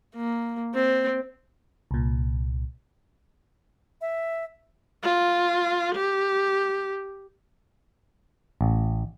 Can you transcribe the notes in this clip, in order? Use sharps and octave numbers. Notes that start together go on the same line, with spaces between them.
A#3
C4
C2 A#2
E5
F4
G4
A1